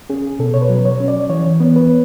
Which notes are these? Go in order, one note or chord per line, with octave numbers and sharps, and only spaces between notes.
C#4 G#4
B2 A4
C#5
B4
F#3
C#5
C#4
D5
E3 C#5
B3
B4